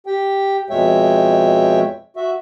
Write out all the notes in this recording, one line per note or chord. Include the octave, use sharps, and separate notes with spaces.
G4 G5
F2 B2 G#3 C#5 E5 G5
F#4 E5